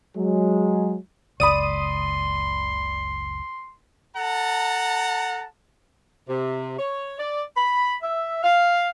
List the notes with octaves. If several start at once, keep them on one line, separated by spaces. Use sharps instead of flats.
F#3 G#3
F#1 C#2 D5 B5 C6 D#6 D#7
A4 F#5 A5 A#5
C3
C#5
D5
B5
E5
F5